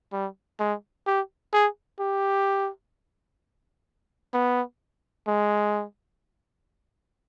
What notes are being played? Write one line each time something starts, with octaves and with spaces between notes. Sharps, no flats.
G3
G#3
G4
G#4
G4
B3
G#3